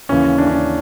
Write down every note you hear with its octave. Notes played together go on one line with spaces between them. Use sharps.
D#2 C#3 E3 C#4
D4
C#4
D4